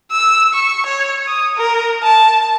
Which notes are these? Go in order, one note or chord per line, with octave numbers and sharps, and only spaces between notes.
E6
C#6
C#5
D#6
A#4
A5